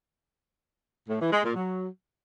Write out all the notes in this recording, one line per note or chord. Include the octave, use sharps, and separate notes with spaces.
A2
E3
G#3
A#2
F#3